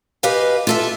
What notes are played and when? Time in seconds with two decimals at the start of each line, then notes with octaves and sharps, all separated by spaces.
0.23 G4 B4 D#5 F5 G#5
0.67 F4 A4 E5